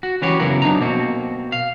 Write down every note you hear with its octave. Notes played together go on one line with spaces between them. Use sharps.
F#4
E3 C#4 F#4 G4 C#5
F#2 C#3 B3 E4 A#4 F#5
F#3 D4 D#4 A#5
B2 A#3 C4 F#4
F5